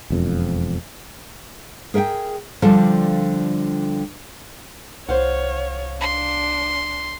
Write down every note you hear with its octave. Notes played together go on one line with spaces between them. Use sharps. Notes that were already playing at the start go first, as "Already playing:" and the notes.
E1 F2
G#4 A#4 E5 F#5 G5
D3 F3 G3 F4 A4 A5
C2 C5 C#5 F5 F#5
D4 C6